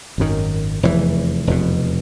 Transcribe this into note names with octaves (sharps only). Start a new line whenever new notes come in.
G#1 F#2 D#3
F1 E2 C3 E3
F1 E2 B2